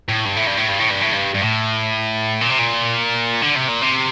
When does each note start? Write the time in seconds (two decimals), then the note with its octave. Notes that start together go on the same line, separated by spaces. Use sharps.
0.09 A2
0.25 G2
0.36 A2
0.47 G2
0.58 A2
0.69 G2
0.80 A2
0.91 G2
1.02 A2
1.13 G2
1.34 G2
1.42 A2
2.41 A#2
2.51 C3
2.59 A#2
3.42 D3
3.55 C3
3.68 A#2
3.81 C3